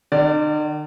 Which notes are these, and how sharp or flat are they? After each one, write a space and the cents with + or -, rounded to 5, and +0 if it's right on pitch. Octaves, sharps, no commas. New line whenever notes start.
D#3 -45 D5 +0